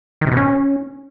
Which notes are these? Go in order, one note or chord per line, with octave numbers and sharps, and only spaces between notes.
D#3
C3
B2
C#4